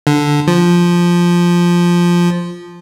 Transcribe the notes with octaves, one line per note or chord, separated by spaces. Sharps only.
D3
F3